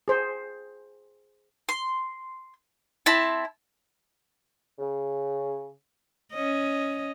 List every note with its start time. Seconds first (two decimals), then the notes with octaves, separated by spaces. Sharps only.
0.08 G#4 C5
1.69 C6
3.06 C4 E4 A5
4.79 C#3
6.34 C#4 D#5